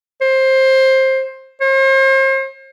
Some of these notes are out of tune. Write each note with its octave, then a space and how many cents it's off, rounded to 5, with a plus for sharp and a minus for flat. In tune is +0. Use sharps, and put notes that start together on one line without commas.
C5 +15
C5 +40